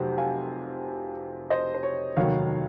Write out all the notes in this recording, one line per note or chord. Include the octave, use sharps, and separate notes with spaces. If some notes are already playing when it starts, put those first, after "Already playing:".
Already playing: F1 F2 C3 F#3 C5 F#5
F5 G#5
C5 D#5
C5
C#5
F1 D#2 D#3 F#3 C#5 F5